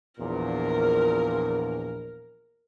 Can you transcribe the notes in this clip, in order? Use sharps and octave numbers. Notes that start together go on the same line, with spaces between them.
A#1 E2 A#2 A#4